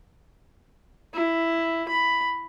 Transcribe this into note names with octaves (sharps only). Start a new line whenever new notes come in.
E4
B5